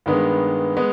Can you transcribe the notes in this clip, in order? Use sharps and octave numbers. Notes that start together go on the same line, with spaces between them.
G2 D#3 G#3 B3
G#3 B3